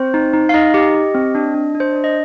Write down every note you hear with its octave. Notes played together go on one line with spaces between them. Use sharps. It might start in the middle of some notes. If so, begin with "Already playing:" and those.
Already playing: C4 C5
D#4
D#4
F5
D#4 D#5
G4
G4
C4
D4
D4
D4
C5
D4 D5
D#5